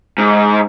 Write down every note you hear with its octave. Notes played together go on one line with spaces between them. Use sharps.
G#2